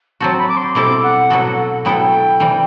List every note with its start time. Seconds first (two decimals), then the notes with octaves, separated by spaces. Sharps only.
0.20 F#3 C4 F#4 A5
0.38 B5
0.48 D6
0.57 C6
0.75 B2 G3 C4 E4 A4 D6
1.03 F#5
1.30 B2 F#3 B3 F#4 A4
1.85 F#3 B3 E4 A4 G5
2.40 C3 E3 G3